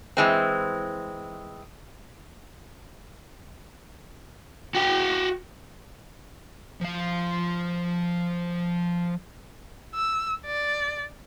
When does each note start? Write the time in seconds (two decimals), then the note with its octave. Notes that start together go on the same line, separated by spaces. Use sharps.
0.17 E3 G#3 C4
4.75 F#4 G5
6.81 F3 F5
9.95 E6
10.46 D5